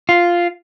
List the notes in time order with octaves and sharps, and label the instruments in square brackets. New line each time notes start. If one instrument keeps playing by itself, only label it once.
[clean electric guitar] F4